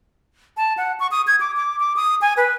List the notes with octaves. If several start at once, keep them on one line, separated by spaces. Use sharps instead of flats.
A5
F#5
C#6
D#6
G#6
D6
D6
D6
D#6
G#5
B4